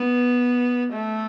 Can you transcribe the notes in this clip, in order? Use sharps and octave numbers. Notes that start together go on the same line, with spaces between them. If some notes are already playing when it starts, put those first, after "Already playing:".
Already playing: B3
A3